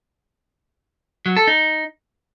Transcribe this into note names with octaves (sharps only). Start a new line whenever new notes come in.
F#3
A4
D#4